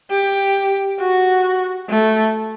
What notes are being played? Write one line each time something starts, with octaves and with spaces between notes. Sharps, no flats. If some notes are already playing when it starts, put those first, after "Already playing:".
G4
F#4
A3